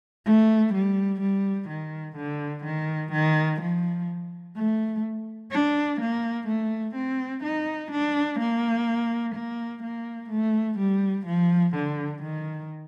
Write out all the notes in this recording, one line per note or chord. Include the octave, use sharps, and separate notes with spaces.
A3
G3
G3
D#3
D3
D#3
D#3
F3
A3
D4
A#3
A3
C4
D#4
D4
A#3
A#3
A#3
A3
G3
F3
D3
D#3